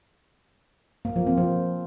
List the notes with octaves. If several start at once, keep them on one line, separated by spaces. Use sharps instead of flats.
A#3
F3
C4
F3